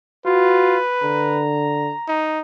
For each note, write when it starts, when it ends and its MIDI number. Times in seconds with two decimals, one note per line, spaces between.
0.26 0.77 65
0.26 0.81 66
0.26 1.44 71
1.02 1.92 50
1.02 2.30 82
2.08 2.41 63